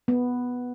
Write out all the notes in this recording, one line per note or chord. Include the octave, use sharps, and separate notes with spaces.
B3